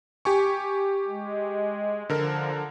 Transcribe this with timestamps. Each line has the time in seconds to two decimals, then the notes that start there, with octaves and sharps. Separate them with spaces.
0.25 G4 G#5 C#6
1.07 G#3
2.10 D3 F3 A#4